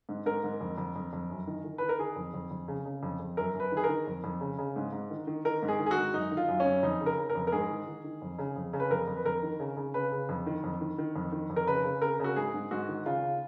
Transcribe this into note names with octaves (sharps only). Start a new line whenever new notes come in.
G#2
G#2 A#4
G#2
F2
F2
F2
F2
F#2
D#3
D#3
D#3 B4
A#4
D#3 G#4
F2
F2
F2
C#3
C#3
F2
F2
F#2 A#4
F#2
B4
D#3 G#4
A#4
D#3
F2
F2
C#3
C#3
G#2
G#2
D#3
D#3
D#3 A#4
G#2
G#4
D#3
G#4
F#4
G#2
F#2 D#4
D#3
F4
F#2
C#4
F#2
F2 D#4
C#3
A#4
C#3
A#4
F2
A#4
G#2 G#4
D#3
D#3
D#3
F2
C#3
F2
C#3
B4
F2 A#4
F2
B4
F2 A#4
D#3
C#3
C#3
C#3 B4
C#3
F2
D#3
F2
D#3
D#3
F2
D#3
F2
A#4
C#3 B4
C#3
C#3 A#4
C#3 F#4
G#2 G#4
G#2
G#2 F#4
D#3
C#3 F4
C#3